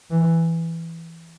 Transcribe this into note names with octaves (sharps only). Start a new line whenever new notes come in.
E3